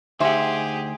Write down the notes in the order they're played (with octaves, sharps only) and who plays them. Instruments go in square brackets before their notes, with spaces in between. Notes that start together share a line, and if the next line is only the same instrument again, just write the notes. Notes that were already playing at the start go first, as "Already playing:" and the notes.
[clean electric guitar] D2 D#4 C5 [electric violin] G4 G#4 [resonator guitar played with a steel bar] E5 F#5 [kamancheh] G#5